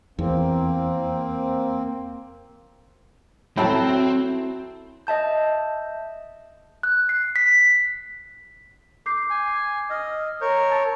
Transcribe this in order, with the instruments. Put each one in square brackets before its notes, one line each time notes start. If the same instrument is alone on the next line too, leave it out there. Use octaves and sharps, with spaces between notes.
[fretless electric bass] E2 [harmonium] A#3 C4
[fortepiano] F#3 G5 [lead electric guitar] C4 [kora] E4 A4
[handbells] D#5 E5 A5 G6
[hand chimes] F#6
C7
B6
[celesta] D6 G6 C7
[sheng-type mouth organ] G#5
[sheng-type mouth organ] D#5 [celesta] E6 F6
[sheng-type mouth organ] A#4 C#5 [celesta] G6
[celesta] A5 E6 A6